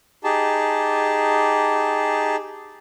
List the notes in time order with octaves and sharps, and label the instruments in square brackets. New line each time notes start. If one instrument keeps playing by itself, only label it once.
[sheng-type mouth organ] D#4 G4 G#4 A5